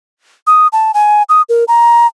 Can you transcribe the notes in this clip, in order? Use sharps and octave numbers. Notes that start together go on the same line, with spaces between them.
D#6
A5
G#5
D#6
A#4
A#5